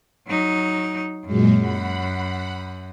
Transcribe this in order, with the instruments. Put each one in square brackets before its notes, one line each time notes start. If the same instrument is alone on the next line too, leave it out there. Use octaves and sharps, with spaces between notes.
[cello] F#3 D#4
[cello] F#2 [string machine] A#2 F#3 G#3
[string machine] F#5 B5